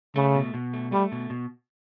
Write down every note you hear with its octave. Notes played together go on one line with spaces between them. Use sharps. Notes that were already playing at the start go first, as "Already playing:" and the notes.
C#3 A3
B2
B2
A3
G3 A3
B2
B2